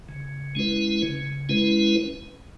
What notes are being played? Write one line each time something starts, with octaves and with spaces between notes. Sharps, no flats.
C#3
G#3 C#4 E4 B4
C#3
G#3 C#4 E4 B4